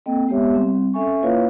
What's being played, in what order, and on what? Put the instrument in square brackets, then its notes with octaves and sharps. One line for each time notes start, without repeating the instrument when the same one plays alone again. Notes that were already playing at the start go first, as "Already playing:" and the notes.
[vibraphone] A#3 C4 A4 D#5 G5
G#3 B3 G4 C#5 E5
G3 C4 C6
C#4 A4 E5 G#5 C#6
A#3 E4 F4 B4 C#5 F5